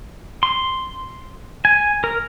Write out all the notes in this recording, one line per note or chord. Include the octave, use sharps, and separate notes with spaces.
C6
G#5
A#4